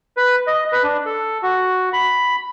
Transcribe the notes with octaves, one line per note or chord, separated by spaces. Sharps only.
B4
D#5
B4
D4
A4
F#4
B5